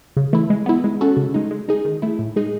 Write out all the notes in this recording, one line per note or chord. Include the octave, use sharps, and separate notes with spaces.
C#3
E3 A3 E4
G#3
B3 E4
G#3
C#4 F#4 A4
C#3
G#3 D#4
G#3
D#4 G#4
D#3
A3 E4
A2
G#3 D#4 G#4